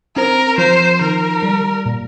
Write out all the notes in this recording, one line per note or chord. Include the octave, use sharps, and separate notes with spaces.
C4 A#4
F3 C5
D#3 A#4
G3
A#2